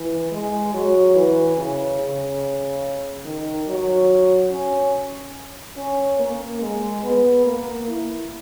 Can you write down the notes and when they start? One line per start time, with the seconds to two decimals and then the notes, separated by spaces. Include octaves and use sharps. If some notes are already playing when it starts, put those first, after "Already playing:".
Already playing: E3
0.31 G#3
0.73 F#3
1.15 E3
1.57 C#3
2.00 C#3
3.25 D#3
3.67 F#3
4.51 C#4
5.77 C#4
6.19 A#3
6.61 G#3
7.03 B3
7.45 A#3
7.88 E4